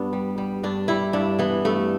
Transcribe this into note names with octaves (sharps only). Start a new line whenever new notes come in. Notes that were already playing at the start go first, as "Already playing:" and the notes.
Already playing: G2 B3 D4
G3
G3
G2 D4
G3 E4
G2 D4
E3 B3
G2 A3